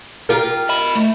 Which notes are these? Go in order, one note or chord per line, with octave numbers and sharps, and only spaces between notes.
F4 G4 A#4
D#5 B5
A3